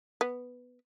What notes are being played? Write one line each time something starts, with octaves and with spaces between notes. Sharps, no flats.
B3